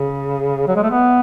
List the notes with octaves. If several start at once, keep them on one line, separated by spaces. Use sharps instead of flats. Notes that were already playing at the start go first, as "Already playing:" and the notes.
Already playing: C#3
F#3
G#3
A3
B3